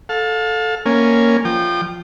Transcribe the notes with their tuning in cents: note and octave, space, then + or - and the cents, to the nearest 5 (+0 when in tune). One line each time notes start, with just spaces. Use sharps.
A4 +0 F5 +35
A#3 +0 C#4 +0 G#5 +0
F3 +0 G5 -5 D#6 -45